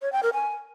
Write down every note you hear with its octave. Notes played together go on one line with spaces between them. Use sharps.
C#5
G5
A#4
G#5